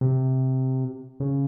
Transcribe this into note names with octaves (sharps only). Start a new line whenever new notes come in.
C3
C#3